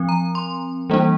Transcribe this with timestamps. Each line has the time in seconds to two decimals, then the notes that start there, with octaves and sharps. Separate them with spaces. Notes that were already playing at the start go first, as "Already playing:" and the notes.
Already playing: F3 C4
0.09 A#5
0.35 C6
0.90 E3 G3 A#3 D4